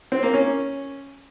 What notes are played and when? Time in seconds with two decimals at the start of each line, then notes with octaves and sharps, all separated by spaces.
0.12 C4
0.23 A#3
0.34 C#4